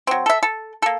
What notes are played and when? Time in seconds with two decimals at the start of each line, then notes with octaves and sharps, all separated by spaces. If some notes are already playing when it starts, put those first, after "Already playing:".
0.07 F#3 C4
0.26 A4 E5
0.43 A4
0.82 A#3 A4